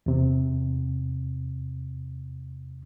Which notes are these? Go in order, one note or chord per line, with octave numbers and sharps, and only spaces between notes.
E2 C3